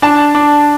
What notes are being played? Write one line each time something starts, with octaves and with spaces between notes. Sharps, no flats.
D4 A5
D4